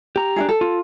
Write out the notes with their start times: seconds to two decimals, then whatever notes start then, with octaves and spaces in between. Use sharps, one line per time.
0.16 G4 A#5
0.36 D4 E4 G#4
0.49 A4
0.61 F4